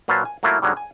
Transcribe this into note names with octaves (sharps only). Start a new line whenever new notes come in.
A#2 F#3 B4 C5 F5 A5
G#5
F#3 A3 A#3 E4 F4
G#2 D3 F#3 G3
G#5